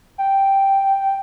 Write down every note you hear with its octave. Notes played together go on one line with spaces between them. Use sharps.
G5